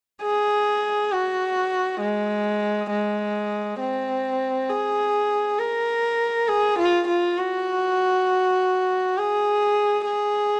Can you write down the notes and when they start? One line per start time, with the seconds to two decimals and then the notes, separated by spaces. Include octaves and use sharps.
0.22 G#4
1.11 F#4
2.01 G#3
2.90 G#3
3.81 C4
4.69 G#4
5.58 A#4
6.48 G#4
6.79 F4
7.08 F4
7.38 F#4
9.17 G#4
10.07 G#4